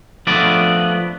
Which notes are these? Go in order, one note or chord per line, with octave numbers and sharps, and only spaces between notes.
F3 A3 B3 D4 D5